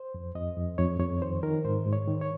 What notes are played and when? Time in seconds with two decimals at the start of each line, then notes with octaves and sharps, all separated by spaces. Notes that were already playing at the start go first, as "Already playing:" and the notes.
Already playing: C5
0.14 F2
0.35 F2 D#5
0.57 F2
0.78 F2 C#5
1.00 F2 C#5
1.22 D#3 C5
1.43 D#3 A#4
1.65 G#2 C5
1.86 G#2
1.93 C#5
2.07 D#3
2.21 C#5